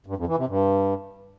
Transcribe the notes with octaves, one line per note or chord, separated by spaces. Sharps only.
G2
F2
E3
C3
G2